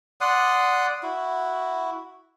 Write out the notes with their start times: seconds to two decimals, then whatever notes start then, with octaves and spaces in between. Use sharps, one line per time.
0.21 D5 F#5 C6 D#6
1.03 E4 F#4